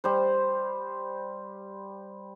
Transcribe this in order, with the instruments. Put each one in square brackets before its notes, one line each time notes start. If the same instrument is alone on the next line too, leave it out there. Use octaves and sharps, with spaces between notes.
[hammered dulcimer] G3 C5